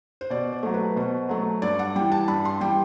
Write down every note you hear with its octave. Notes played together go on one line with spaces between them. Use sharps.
C5
B2 D5
C5
F#3 A3
B4
B2 C5
F#3 A3
G2 D5
F#5
E3 G3 G5
A5
G2 B5
C6
E3 G3 G5